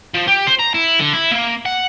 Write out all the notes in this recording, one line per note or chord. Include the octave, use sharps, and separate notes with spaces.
F3
G4
C5
A#5
E4
D3
E4
A#3
F#5